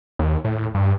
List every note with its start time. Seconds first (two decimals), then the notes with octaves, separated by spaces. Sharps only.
0.19 D#2
0.44 A2
0.75 G2